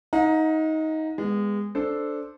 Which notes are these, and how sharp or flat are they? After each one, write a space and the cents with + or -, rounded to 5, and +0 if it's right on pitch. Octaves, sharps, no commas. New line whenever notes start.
D#4 +20 F#5 -40 A#5 +0
G#3 -20 B3 +0
D4 +0 A4 +0 C5 -5